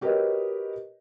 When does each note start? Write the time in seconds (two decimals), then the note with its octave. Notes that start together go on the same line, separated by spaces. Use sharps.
0.01 F#4 G4 A#4 B4 C#5 D#5